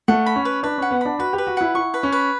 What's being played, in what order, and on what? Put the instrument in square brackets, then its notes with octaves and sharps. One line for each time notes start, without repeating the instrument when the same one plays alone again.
[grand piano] A3 [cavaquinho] F#5
[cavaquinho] B5
[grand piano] C#4
[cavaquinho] B4
[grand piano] D4 [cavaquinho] B4
[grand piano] C#4 [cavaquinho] F#5
[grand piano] B3
[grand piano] D4 [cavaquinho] B5
[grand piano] F#4 [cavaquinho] B4
[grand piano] G4
[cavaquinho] B4
[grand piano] F#4
[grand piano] E4 [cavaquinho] F#5
[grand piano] E4 [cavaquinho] C#6
[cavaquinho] B4
[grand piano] C#4
[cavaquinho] B4